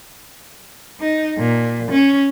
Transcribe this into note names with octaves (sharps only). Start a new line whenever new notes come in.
D#4
A#2
C#4